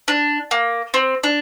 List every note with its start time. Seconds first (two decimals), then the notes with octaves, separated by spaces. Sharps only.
0.08 D4
0.51 A#3
0.94 C4
1.24 D4